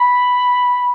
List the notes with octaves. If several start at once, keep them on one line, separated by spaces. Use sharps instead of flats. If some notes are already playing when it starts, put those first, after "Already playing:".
Already playing: B5